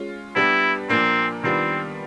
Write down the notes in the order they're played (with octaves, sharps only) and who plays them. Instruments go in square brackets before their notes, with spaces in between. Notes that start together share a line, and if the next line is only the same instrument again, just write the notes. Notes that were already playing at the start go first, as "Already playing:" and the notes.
Already playing: [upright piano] G#3 C#4 F4
[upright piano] G3 B3 D4 G4 B4 [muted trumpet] E4
[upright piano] A#2 F3 A#3 D4 [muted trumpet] C4
[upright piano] D#3 G3 B3 D4 F4 [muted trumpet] C4